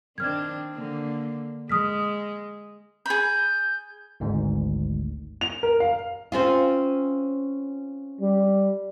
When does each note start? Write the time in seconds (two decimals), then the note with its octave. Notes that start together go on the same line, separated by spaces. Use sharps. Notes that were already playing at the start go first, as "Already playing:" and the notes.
0.18 D#3 C4 D4 F6 G#6
0.75 D3 A#3
1.69 G#3 D#6 F6 B6
3.06 G#4 B5 G6
4.20 G#1 D2 G#2
5.41 F7
5.63 A#4
5.80 F5
6.32 C4 C#4 F4
8.21 G3